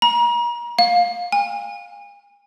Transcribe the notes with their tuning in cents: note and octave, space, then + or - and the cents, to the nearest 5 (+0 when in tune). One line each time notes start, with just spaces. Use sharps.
A#5 +40
F5 +20
G#5 -40